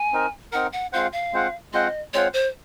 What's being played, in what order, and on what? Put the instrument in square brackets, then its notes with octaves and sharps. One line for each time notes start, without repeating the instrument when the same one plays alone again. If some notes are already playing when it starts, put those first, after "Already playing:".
Already playing: [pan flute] G#5
[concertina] C4 D#4 A#4
[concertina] C4 D#4 A#4 [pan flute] F#5
[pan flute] F#5
[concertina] G#3 C4 F4 C5 F#5 [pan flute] F5
[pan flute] F5
[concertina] G#3 C4 F4 C5 F#5
[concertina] G#3 C4 F4 C5 F#5 [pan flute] D#5
[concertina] G#3 C4 F4 C5 F#5 [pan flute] C#5
[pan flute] C5